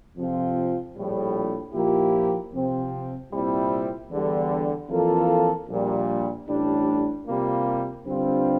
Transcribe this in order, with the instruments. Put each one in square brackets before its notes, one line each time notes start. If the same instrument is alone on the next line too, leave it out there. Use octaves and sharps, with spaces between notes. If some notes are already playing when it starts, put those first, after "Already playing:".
[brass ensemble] F2 C3 F3 C4 F4
A#1 A2 G3
A#2 F3 A#3 E4 G4
C3 F3 C4
C2 A#2 G3 C4 E4
E2 D3 G3
F2 E3 A#3 F4 A4
A#1 A#2 G3
A1 A2 G3 D4
C3 G3 A#3 F4
G2 D3 G3 C4 F4